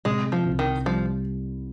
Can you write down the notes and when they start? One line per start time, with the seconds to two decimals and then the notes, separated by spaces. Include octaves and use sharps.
0.05 C3 G#3
0.32 F3
0.45 C2
0.59 D#3
0.85 F3 G3